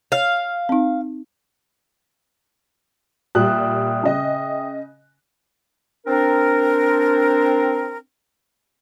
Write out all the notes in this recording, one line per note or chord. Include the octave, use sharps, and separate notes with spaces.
C#5 F5
C4 D#4
A#2 G3 E5 G5 D#6 F#6
C#3 D#5
C4 D4 A#4